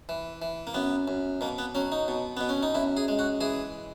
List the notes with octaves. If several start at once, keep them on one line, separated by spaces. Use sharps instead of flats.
E3
E3
A#3
F#2 B3
F#2
B2 A#3
B3
F#3 C#4
D#4
B2
B2 B3
C#4
D#4
F#2 E4
G#4
G#3
F#4
E3 G#4